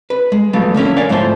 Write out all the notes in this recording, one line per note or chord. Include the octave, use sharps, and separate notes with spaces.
B4
G#3
F3 F#3 A3 B3
D3 A#3 C#4 E4
A#4 C#5 D5 F5 F#5 G#5
G#2 F3 A3 E4 C5